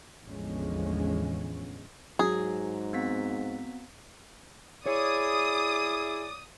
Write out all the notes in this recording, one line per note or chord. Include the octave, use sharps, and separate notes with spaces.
A1 E2 D3 F3 G#3 C#4
G#2 F#3 G#4
B3 C4 B6
E4 G#4 C#5 D5 D#6